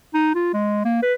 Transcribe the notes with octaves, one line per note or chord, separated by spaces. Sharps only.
D#4
F4
G#3
A#3
B4